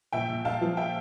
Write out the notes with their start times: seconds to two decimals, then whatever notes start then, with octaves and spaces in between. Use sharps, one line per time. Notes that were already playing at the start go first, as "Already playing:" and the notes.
0.12 A#1 E5 G5
0.29 A#1
0.45 A#2 F5 A5
0.61 F3
0.77 E5 G5